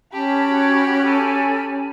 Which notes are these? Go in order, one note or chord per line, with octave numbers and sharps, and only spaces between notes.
C#4 G4 A5 B5
F#4 G#6
A4 G#5